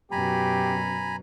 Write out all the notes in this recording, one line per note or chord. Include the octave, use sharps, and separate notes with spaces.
F#2 B2 G4 G#5 A#5 B5